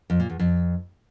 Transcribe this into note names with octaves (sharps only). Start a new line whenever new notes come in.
F2
A#2
E2
F2